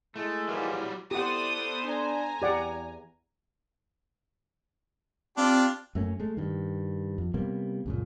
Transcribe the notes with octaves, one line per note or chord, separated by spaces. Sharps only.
G#3 A3 E4
G#2 E3 F#3 G3 A#3
B3 E4 G4 A4 C5 D5 F#5 D#6
D4 G#5 A#5
E2 G4 D5 F#5
C4 D4 F4 G4
F#2 A3 A#3 C#4
G#3 A3
G2 D#3
F2
C3 G3 A#3 B3
C#2 F#2 A#2